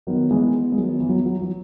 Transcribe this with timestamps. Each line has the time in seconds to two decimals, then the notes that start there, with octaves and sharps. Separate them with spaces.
0.07 D#3 F#3 B3
0.31 E3 G#3
0.72 G#3
0.77 D#3 F#3
1.00 E3
1.09 F#3
1.17 E3
1.26 F#3
1.34 E3
1.41 F#3